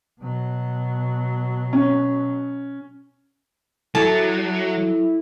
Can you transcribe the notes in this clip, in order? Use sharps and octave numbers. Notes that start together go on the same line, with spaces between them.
B2 F#3
C#4
F#3 E4 A4 A5